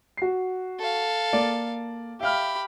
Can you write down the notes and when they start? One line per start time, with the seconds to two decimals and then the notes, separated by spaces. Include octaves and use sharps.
0.17 F#4 C7
0.79 A4 F5
1.33 A#3 D5
2.20 G4 E5 F5 B5 F6